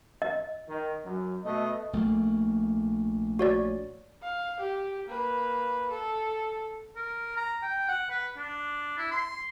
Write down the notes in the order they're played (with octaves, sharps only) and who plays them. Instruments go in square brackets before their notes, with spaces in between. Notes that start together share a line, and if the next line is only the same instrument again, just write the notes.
[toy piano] D#5
[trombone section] D#3
F#2
[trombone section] B2 A3 [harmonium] D#5
[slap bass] A#1 A3 A#3
[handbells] F#4 C#5 D5
[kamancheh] F5
G4
A#3 B4
A4
[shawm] A#4
A#5
G5
F#5
B4
D4
E4
C6